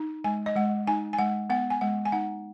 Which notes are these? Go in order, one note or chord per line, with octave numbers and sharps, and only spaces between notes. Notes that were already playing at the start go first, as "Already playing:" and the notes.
Already playing: D#4
G#3 G#5
D#5
G#3 F#5
D#4 G#5
G#5
G#3 F#5
B3 F#5
G#5
G#3 F#5
G#5
D#4 F#5